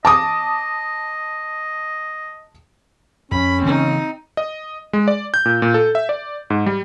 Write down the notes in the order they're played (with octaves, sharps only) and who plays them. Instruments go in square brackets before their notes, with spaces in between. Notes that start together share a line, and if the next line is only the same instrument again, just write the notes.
[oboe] D#5 [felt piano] A5 D6 D#6
[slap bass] F2 [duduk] C#4 [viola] B5
[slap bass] C#3 E3 A#3 [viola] C4 D#4
[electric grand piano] D#5
G#3
D5
G6
A#2
A#2
A4
E5
D5
G#2
G3